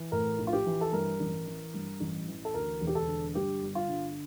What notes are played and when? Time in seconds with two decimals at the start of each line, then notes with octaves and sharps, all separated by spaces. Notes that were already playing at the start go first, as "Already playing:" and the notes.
Already playing: E3
0.12 A2 A#4
0.39 A#1
0.47 F4
0.53 G4
0.66 E3
0.81 A4
0.93 G2 A#4
1.20 A1
1.46 E3
1.74 G2
2.00 A1
2.27 E3
2.45 A4
2.54 D2 A#4
2.81 E1
2.87 G4
2.95 A4
3.08 D3
3.35 G2 G4
3.62 G1
3.75 F4
3.88 D3